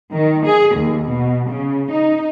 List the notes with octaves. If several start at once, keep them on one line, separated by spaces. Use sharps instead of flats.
D#3
G#4
D#2
B2
C#3
D#4